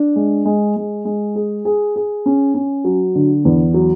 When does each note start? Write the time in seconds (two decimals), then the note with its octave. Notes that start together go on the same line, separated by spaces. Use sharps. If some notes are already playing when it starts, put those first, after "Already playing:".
Already playing: D4
0.16 G#3
0.45 G#3
0.76 G#3
1.05 G#3
1.35 G#4
1.65 G#4
1.96 G#4
2.26 C#4
2.54 C#4
2.84 F#3
3.15 D3
3.45 E2
3.74 F#3